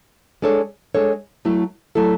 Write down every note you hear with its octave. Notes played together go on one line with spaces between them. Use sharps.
G#3 D4 A4 C#5
G#3 D4 A4 C#5
F#3 A3 E4 A4
F#3 A3 E4 A4